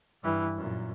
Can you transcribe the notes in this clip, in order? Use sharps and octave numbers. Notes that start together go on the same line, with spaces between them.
G2 E3
F#2 A#2